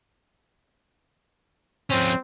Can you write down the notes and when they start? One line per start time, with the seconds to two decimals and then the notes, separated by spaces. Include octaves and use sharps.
1.91 F3 C4 C#4